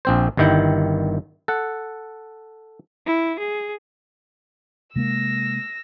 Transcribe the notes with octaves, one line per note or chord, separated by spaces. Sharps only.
A#1 C4 C5
G1 G2 D#3 E4 G5
A4 F#5
E4
G#4
C3 G#3 A#3 E6 A#6